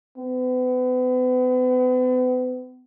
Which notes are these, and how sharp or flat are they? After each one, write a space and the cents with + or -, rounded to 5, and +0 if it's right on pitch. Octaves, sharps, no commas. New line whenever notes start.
B3 +40